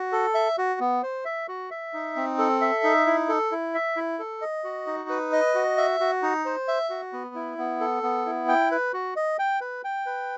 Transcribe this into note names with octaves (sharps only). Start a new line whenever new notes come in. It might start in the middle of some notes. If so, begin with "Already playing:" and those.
Already playing: F#4
A4
E5
F#4
B3
C5
E5
F#4
E5
D#4
C4
A4
E5
D#4
E4
A4
E4
E5
E4
A4
D#5
F#4
D#4
B4
D#5
F#4
E5
F#4
D#4
C5
E5
F#4
B3
E4
B3
A4
B3
E4
G5
B4
F#4
D#5
G5
B4
G5
B4